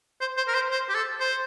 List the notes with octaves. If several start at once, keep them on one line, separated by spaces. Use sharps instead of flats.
C5
C5
A#4
C5
C5
G4
A4
C5